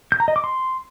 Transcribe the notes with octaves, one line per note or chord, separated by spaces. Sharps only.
G6
A#5
D#5
D6
C6